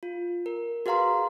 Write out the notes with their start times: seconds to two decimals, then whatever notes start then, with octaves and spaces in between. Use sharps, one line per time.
0.03 F4
0.46 A#4
0.86 F#4 G#4 B4 F5 A#5 C6